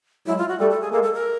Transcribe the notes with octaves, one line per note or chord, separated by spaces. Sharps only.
F#3 G#3 E4
F4
F#4
G3 A3 A4
A4
G#4
G#3 A#3 A4
A4
A#4